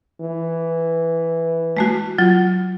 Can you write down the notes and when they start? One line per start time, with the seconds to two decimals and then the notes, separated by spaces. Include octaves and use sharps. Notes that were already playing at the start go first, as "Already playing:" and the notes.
0.22 E3
1.77 G#3 A3 F#4
2.18 F#3 F4